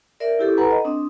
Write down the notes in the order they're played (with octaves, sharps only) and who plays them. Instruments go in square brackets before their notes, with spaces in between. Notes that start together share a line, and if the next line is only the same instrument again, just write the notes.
[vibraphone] A#4 D5 E5
E4 G4 A4
A4 B4 F#5 G#5 A#5 B5
D#5
C4 D4 D#6